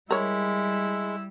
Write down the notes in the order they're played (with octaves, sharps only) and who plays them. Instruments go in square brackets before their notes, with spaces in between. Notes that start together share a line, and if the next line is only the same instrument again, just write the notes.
[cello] G3 [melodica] G#3 [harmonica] E4 E6 [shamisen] A#4 C#5